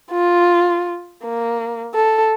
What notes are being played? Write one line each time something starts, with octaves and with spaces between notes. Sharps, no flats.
F4
A#3
A4